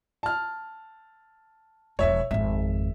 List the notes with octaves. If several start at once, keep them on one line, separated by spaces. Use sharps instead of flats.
A5 F6
E1 F3 C#5 E5
G#1 F2 E5